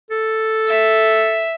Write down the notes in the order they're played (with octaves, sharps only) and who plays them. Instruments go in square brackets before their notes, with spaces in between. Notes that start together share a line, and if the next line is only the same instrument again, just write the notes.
[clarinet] A4
[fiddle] E5